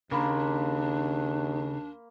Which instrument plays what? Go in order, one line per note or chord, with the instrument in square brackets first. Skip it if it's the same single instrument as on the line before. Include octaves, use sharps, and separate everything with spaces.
[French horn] D#2 [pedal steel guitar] C#3 [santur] A#3 B5 C6 [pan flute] D4